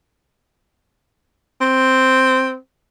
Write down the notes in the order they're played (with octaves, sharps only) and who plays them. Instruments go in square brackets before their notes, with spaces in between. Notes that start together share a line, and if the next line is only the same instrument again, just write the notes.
[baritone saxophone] C4